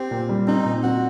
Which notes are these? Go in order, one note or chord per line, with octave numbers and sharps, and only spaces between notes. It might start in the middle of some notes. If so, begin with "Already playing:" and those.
Already playing: C4 G4
A#2
G3
C4 D#4
A#2
C4 F#4